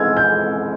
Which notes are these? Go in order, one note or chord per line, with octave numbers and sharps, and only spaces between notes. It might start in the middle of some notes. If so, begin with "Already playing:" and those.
Already playing: F2 E3 G#3 E6 F6 G#6
G6